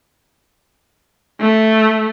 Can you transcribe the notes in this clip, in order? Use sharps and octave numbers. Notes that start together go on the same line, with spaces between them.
A3